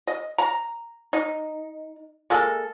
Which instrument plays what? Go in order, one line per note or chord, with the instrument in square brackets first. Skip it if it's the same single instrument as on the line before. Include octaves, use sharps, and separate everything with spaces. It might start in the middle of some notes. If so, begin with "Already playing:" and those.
[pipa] D#5
A#5
D#4
G#3 A#3 A4